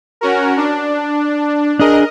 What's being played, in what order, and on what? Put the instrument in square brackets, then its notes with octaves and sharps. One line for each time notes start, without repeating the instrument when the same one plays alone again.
[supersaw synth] C#4 F#4 A#4
D4
[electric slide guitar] D4 G#4 [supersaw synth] A#4 D#5